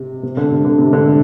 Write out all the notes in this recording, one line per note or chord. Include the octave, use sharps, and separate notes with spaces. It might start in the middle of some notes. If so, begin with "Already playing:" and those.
Already playing: C3
C3
D3
C3
D3
C3
D3
C3